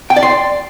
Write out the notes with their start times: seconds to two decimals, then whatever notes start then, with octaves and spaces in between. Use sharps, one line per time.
0.10 G5
0.16 D5
0.23 C6